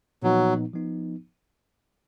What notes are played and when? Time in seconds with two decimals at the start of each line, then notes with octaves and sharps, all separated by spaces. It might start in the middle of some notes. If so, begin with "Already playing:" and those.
0.22 A#2 F3 F#3 B3 D#4
0.74 F3 B3 D#4